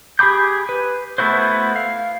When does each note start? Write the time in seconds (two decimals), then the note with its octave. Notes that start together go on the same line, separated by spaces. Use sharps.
0.19 G4 G#4 B5 D6 G6
0.69 B4
1.18 A3 B3 E4 F#4 C5
1.76 F5